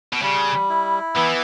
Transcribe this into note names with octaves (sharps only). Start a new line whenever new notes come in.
B2
C#3 G3
E4
E3 B3